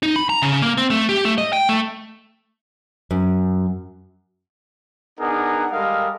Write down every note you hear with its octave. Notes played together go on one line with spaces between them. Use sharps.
D#4
B5
A#5
C#3
A#3
C4
A3
G4
A3
D#5
G5
A3
F#2
B3 D4 D#4 G#4 A#4 F#5
G3 G#3 A4 A#4 D#5 F5